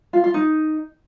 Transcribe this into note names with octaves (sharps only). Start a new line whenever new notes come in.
F4
F4
D#4